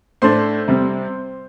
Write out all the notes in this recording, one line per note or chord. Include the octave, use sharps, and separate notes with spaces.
A2 A3 D4 C5 C6
C3 G3 C4